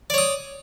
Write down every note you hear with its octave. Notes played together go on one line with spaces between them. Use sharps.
C#5 D5 D#6